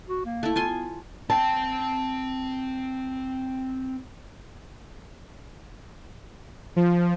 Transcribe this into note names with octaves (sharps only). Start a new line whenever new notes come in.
F#4
A#3
A3 E4
B3 F4 G#5 C6
C4 G5 A5
F3